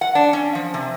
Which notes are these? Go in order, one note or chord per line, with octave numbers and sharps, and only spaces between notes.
F#5
D4
C#4
F3
C3